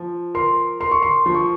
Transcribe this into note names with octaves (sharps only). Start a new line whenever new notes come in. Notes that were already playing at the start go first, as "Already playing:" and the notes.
Already playing: F3
A#4 C6
A#4 C6
C#6
C6
F3 C6
C#6